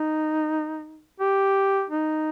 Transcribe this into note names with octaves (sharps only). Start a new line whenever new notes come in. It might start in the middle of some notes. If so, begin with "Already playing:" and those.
Already playing: D#4
G4
D#4